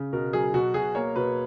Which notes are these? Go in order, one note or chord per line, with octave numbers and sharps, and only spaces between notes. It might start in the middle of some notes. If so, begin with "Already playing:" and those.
Already playing: C#3
B2 A#4
F#3 G#4
B2 F#4
B2 G#4
A#3 C#5
B2 B4